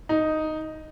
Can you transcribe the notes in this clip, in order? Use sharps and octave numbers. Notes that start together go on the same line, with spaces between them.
D#4